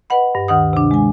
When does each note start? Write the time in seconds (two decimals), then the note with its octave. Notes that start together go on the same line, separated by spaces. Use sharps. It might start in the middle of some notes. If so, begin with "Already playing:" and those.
0.10 B4 D#5 F#5 B5
0.35 G2
0.48 D2 D#3 F#5 D#6
0.73 C3 D4
0.91 G#3 G#5